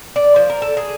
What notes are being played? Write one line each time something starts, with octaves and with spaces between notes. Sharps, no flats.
D5
F3
A#4
A4
G#4